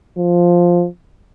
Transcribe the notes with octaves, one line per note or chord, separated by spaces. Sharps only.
F3